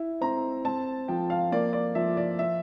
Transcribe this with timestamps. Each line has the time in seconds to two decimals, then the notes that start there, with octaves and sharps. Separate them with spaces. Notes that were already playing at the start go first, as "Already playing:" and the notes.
Already playing: E4
0.21 C4 A#5
0.65 C4 A5
1.08 F3 G5
1.30 F5
1.52 A#3 D5
1.73 D5
1.95 F3 E5
2.17 D5
2.39 E5